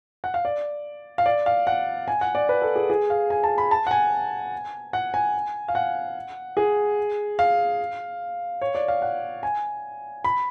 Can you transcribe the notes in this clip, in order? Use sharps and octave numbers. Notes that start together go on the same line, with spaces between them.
F#5
F5
D5
F5
D5
F5
F#5
G#5
F#5
D5
B4
A4
G#4
G#4
F5
G#5
A5
B5
A5
F#5
G#5
F#5
G#5
F5
F#5
G#4
F5
C#5
D5
F5
F#5
G#5
B5